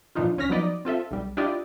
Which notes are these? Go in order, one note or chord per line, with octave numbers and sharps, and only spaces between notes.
A#2 E3 F3 D4 D#4 F4
C#2 C#4 C#5 F6 A#6 B6
F3 F#3 B3 D#4 D5 D#5
C4 F4 A4 E5
B1 G3
D4 E4 F4 G4 D5 D#5